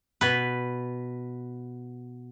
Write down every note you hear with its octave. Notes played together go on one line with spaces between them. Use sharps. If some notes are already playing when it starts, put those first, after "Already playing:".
B2 B4